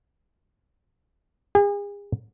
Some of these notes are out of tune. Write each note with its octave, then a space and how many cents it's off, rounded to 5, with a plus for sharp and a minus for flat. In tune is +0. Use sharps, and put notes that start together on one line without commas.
G#4 -40